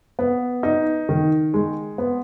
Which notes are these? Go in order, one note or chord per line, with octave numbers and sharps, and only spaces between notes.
B3
D#4
D#3
G#3
B3